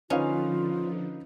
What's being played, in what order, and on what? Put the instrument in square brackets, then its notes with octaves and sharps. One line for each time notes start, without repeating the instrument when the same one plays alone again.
[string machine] D3 F3 [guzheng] C#4 [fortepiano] D#4 B4 F5 [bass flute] F4